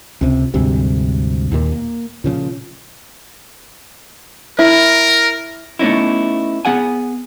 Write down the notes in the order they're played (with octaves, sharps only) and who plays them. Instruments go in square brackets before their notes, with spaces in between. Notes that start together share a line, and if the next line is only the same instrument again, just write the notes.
[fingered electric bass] C#2 C3
D2 G#2 C3 G3
D#2 A#2
A#3
A#2 C#3 F3
[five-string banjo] E4 [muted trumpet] A#4
[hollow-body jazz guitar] A3 B3 C#4 D#4 E4
B3 G#4 F#5 G#5